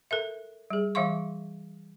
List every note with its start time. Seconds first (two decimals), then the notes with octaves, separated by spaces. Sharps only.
0.11 A4 A#4 E5
0.70 G3 G#4
0.95 E3 G3 E5 F5 C6 C#6